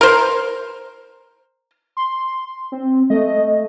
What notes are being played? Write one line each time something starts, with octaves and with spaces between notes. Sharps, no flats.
A#4 C5
C6
C4
A3 D#5